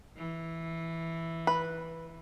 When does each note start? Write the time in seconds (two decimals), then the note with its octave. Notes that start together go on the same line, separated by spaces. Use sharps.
0.16 E3
1.47 B4